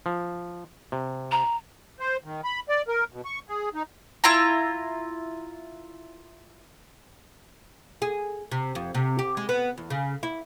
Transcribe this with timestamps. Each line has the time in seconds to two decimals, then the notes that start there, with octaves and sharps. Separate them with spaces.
0.06 F3
0.92 C3
1.31 A#5
2.00 C5
2.24 D#3
2.44 B5
2.69 D5
2.88 A#4
3.13 B2
3.25 C#6
3.49 G#4
3.74 D#4
4.24 E4 F4 A#5
8.02 G#4
8.51 C3
8.75 F2
8.95 C3
9.19 G4
9.37 G#3
9.49 B3
9.78 E2
9.90 C#3
10.23 E4